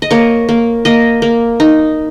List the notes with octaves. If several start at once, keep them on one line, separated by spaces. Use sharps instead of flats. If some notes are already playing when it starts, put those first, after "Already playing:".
D#5
A#3 C#5
A#3
A#3 D#5
A#3
D#4